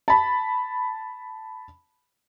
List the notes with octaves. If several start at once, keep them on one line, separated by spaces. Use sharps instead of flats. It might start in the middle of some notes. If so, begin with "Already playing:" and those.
A5 B5